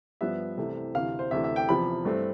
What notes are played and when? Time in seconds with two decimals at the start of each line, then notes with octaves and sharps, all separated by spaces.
0.21 G2 F3 B3 E5
0.57 C2 C3 E3 A3 C4
0.94 D2 C3 E3 F5
1.19 C5
1.31 D2 C3 E3 A3 E5
1.44 E5
1.56 G5
1.69 E2 C3 F3 B5
2.05 G2 E3 A3 C4